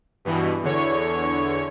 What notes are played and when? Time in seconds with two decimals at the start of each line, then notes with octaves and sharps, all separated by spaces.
0.25 G2 B2 E3
0.63 E2 D3 C#5